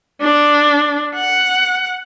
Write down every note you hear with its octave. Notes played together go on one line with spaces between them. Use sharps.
D4
F#5